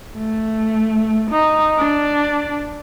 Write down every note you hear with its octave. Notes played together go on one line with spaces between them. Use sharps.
A3
D#4
D4